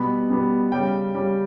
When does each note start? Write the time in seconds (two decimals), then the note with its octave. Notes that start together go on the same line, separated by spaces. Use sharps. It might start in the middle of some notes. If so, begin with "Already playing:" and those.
Already playing: B2 G3 B3 B5
0.30 B2 G3 B3
0.72 C#3 G3 C#4 G5
1.14 C#3 G3 C#4